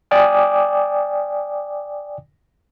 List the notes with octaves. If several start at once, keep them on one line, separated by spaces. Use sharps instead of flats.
D5 G5 G#5 D6 D#6